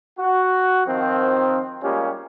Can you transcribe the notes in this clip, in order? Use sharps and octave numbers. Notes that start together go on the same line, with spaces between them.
F#4
D#3 F3 C4
G3 G#3 A#3 C#4 F4 G4